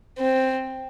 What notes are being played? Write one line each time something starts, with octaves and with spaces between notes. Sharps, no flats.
C4